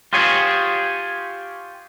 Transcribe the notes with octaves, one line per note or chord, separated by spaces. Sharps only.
F4 G4 G#4 C#5